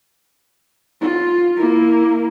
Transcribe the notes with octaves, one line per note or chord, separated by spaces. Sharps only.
F4
A#3 E4